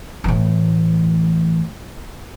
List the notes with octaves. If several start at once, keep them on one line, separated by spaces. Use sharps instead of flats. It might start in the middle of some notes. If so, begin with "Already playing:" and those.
A2 E3